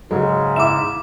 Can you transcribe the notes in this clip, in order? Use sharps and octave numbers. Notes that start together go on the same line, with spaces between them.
G#2 C#3 F#3 G#3
E4 E5 D6 E7